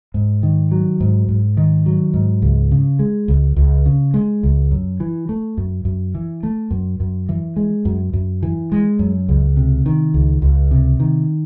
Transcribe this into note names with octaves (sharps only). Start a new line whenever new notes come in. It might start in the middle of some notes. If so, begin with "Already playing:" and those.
G#2
D#3
F#3
G#2
G#2
D#3
F#3
G#2
C#2
C#3
G#3
C#2
C#2
C#3
G#3
C#2
F#2
E3
A3
F#2
F#2
E3
A3
F#2
F#2
E3
G#3
F#2
F#2
E3
G#3
F#2
C#2
C3
D#3
C#2
C#2
C3
D#3